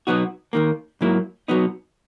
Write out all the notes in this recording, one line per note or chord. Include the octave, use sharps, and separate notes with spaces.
B2 F#3 B3 D#4 F#4
D#2 D#3 A#3
G#2 F#3 A#3 E4
B2 F#3 B3 D#4